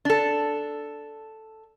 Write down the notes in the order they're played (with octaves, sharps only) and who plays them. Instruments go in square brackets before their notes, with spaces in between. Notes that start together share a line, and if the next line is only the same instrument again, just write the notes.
[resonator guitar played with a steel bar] D4 A4